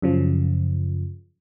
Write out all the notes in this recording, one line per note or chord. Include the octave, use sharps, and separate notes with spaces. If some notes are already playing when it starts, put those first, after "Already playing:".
F#2 C#3 F3